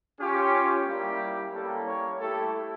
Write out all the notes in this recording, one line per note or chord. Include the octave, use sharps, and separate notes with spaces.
C#4 F4 G4
G3 A#3 E4 G4
G3 A#3 C#4 E4 G4 A4
C#5
A3 E4 G4 A4